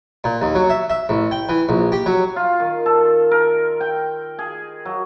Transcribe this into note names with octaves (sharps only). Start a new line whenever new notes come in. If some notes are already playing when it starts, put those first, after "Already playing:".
A#2
D#2
F#3
E5
E5
A1
G5
E3
A#1
G4
F#3
F4
D#3
A4
A#4
G5
G#4
F#3